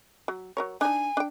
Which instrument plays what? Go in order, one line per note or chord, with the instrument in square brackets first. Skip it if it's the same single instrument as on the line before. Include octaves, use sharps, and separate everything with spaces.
[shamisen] F#3
F#3 A#4 C#5
[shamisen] D4 D#4 [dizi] G#5
[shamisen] D4 G5